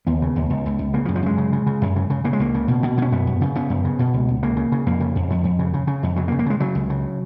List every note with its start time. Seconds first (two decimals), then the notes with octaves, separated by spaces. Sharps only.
0.07 D#2 B3
0.22 C#3
0.36 D#2
0.50 C#2
0.66 C#2
0.79 C#2
0.94 C#3 A#3
1.05 F3
1.08 F#2
1.16 F3
1.23 F#2 G#3
1.38 C#3
1.53 C#3
1.66 C#3
1.82 F#2
1.96 C#3
2.10 C#3
2.24 C#3 A#3
2.33 G#3
2.39 C#2 A#3
2.54 C#3
2.68 B2
2.83 B2
2.98 B2 C#4
3.12 F#2 B3
3.27 F#2
3.41 C#3
3.55 C#3 B3
3.70 F#2
3.85 C#3
3.99 B2
4.14 C#2
4.29 C#2
4.43 C#3 A#3
4.57 C#3
4.72 C#3
4.86 F2 A#3
5.01 C#3
5.15 F2
5.30 F2
5.44 F2
5.59 C#3
5.74 C#3
5.87 C#3
6.03 F2
6.16 C#3 F#3
6.28 A#3
6.32 C#3
6.39 A#3
6.46 C#3 G#3
6.60 C#3 F#3
6.75 C#2
6.90 C#3